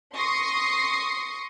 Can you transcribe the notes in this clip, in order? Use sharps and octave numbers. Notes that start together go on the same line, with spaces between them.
C6 C#6 D#6 A#6 C7 C#7